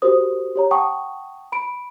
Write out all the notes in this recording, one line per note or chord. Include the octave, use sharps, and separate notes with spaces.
F#4 G4 A#4 C5 D#6
G4 C#5 A#5
F#5 G5 A5 C#6 D#6
B5 D7